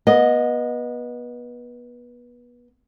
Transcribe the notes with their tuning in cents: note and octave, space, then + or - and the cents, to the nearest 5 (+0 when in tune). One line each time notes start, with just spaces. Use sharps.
B3 -25 D#5 +0